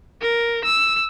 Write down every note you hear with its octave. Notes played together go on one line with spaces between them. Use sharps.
A#4
E6